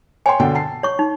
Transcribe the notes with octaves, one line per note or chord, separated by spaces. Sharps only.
C#5 G5 G#5 C6
B2 D3 G5
A5 C7
C#5 C#6
D#4